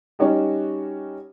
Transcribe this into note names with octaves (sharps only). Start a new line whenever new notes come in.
G3 C#4 D#4 F#4 G4